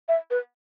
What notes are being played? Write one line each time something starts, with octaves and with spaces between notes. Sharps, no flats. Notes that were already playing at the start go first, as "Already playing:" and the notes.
E5
B4